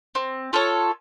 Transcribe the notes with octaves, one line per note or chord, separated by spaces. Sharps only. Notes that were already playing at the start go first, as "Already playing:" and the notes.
C4
F4 A4 C#5